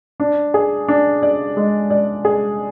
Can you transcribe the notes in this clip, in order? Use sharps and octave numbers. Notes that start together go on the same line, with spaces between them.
D4
G#4
D4
D5
G#3
D5
G#4